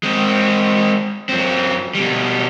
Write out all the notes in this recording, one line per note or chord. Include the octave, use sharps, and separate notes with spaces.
G#3 C4
F#2 C4
B2 G3